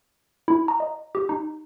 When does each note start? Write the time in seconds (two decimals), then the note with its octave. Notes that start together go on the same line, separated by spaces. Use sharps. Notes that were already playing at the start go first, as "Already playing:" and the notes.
0.48 E4
0.68 A#5
0.80 D#5
1.15 G4
1.29 D#4